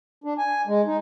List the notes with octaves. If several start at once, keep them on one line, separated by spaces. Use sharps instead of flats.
D4
G#5
G#3
D#4